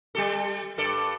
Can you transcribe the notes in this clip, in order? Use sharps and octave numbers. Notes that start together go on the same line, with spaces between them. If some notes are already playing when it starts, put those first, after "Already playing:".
G3 G4 A4
G2 A4 D5